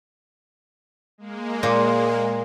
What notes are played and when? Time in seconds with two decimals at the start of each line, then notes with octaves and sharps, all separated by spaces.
1.18 G#3 A#3
1.63 A#2